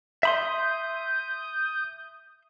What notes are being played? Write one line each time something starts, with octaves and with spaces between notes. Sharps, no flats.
E5 B5 C6 D#6 G6